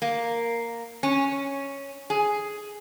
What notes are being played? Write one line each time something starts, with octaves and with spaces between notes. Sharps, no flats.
A#3
C#4
G#4